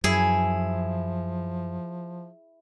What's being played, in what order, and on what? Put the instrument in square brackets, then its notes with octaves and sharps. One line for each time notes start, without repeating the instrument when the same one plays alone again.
[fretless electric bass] F#2 [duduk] F3 [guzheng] E4 G#4